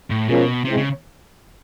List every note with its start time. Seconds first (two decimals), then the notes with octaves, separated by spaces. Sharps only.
0.10 A2
0.29 B2 F3 G#3 C#4 F4 A#4
0.65 C3 G#3 C4 E4
0.77 C#3